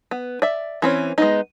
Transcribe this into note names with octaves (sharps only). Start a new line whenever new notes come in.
B3
D5 E5
E3 C4 C#4
G#3 B3 D#4